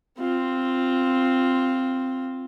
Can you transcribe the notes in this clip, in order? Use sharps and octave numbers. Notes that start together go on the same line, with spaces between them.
C4 F4